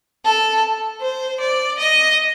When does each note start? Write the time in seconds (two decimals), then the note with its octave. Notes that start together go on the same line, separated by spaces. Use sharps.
0.25 A4
1.01 C5
1.40 D5
1.79 D#5